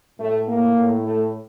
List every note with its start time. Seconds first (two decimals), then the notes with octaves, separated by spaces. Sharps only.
0.19 A2 A3
0.47 A#3
0.75 A2
1.04 A3